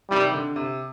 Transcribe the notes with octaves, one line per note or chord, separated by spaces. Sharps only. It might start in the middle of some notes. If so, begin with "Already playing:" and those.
C3 D#3 G3
D3
C3